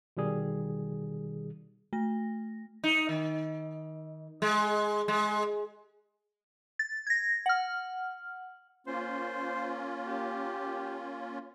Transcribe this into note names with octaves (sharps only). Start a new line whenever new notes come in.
B2 D#3 G3 G#4
A3 A#6
D#4
D#3
G#3
G#3
A6
G#6 A#6
F#5 F6
A#3 C#4 F4 C5
G4